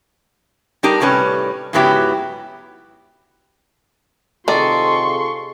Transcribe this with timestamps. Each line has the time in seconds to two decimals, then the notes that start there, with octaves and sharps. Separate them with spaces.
0.83 G3 D4 D#4 G4 A#4
1.00 A2 C3 G3 C#4 B4
1.73 G#2 C#3 F#3 B3 E4 G4
4.48 C3 D#3 F4 G#4 A4 D5 C6 C#6